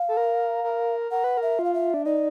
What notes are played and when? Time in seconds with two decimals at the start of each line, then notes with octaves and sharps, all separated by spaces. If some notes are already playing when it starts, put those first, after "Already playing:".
Already playing: F5
0.08 A4
0.17 A#4
0.64 A#4
1.11 A#4 F#5
1.24 B4
1.37 A#4
1.42 E5
1.59 F4
1.64 F5
1.74 E5
1.94 D4
2.05 D#4 D5